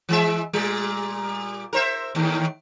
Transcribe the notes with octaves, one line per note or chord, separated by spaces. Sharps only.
E3 G#3 E5
A#2 G3
A#4 C5 E5
D#2 A2 D#3